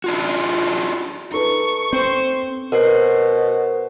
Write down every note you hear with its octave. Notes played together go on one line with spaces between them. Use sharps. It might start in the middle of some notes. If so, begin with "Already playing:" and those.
D4 F4 F#4
D#4 A4 B4 C#6
C4 C5
B2 A#4 C5 C7